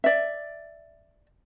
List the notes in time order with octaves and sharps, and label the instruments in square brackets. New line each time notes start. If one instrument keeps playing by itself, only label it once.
[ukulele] D5 E5